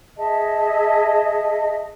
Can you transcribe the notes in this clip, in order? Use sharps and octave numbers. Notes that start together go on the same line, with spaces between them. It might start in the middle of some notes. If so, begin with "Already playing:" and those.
G#4 D#5 E5 A5